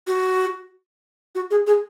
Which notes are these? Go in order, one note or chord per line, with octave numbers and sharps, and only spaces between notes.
F#4
F#4
G#4
G#4